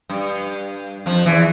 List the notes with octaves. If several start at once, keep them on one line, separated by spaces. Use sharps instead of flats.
G2
F2 F3
E2 E3